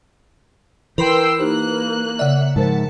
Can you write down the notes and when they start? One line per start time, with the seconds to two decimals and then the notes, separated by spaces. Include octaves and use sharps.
0.98 E3 A#4 B4 G5 B5 C6 E6
1.40 A#3 D#4 G4 C5 F#6
2.19 C#3 D5 E5 F#5
2.56 G#2 F3 A#4 C5 A5